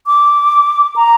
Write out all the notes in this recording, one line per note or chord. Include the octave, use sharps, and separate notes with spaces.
D6
A#5